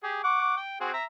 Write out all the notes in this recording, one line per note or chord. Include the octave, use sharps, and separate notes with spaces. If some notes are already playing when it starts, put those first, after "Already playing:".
G4 G#4
F#5 C#6 D6
G5
C4 F#4 G#4
E5 A#5